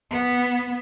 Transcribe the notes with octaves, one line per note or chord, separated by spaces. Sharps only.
B3